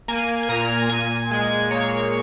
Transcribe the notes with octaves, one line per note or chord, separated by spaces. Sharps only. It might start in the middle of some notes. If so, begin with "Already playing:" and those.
A#3 G#5
G#5
A#2 A#5
A#2 G#5
G#3
A#3 C#5